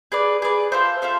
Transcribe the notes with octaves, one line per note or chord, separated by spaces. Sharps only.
G#4 B4 D5
G#4 B4 D5
F4 A4 C5 E5
F4 A4 C5 E5